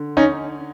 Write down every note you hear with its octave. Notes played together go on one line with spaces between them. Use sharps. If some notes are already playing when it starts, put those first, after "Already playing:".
Already playing: D3
C#4 D#4